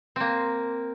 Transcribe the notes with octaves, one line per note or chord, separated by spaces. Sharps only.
A#3 C4